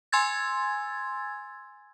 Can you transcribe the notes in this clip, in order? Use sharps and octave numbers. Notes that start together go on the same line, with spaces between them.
G#5 C6 E6 G#6 A6